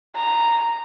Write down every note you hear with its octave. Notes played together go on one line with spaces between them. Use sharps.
A#5